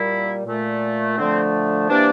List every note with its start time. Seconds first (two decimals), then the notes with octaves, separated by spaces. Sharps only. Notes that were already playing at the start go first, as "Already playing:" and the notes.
Already playing: A#2 G3 A#3 E4
0.46 A#2 A3
1.18 D3 F3 A3 C4
1.89 C3 E3 G3 A#3 D4